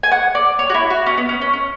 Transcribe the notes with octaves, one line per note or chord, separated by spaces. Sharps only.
G#5
F#5
D5
C#5
F#4
E4
F#4
C#4
B3
C#4
C#4
C#4